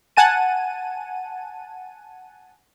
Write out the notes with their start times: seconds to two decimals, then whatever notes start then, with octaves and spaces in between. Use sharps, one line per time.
0.17 F#5 G#5 A5 D#7